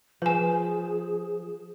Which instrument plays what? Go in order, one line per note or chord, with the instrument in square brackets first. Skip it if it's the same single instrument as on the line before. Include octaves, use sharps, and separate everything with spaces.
[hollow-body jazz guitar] F3 [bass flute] G#4 [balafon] B4 G#5